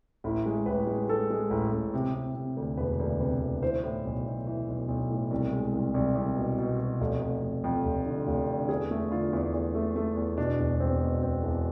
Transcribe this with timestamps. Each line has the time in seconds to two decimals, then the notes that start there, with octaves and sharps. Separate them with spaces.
0.24 A1 E4
0.46 G#3
0.66 A1 B4
0.87 G#3
1.09 G#3 A4
1.30 G#3
1.50 A1
1.72 A1
1.94 C3
2.14 C3
2.35 C3
2.57 D2
2.77 E1 B4
3.00 D2
3.20 C3 B4
3.41 D2
3.62 E3 C5
3.84 A2
4.05 B1
4.26 B1
4.47 E3
4.68 B1
4.88 B1
5.10 A2
5.31 C2
5.53 G#3
5.74 C2
5.94 C2
6.15 C2
6.36 B2
6.58 B2
6.80 B2
7.01 F1
7.21 F1
7.42 F1
7.64 F2
7.85 F1
8.06 D3
8.27 F1
8.48 D3
8.69 E2 G#4
8.91 A3
9.12 D3 F4
9.33 E2
9.53 E2
9.74 A3
9.96 A3
10.17 E2
10.38 B2 D4
10.60 E1
10.80 E1 C4
11.02 B2
11.23 E1 C4
11.43 E1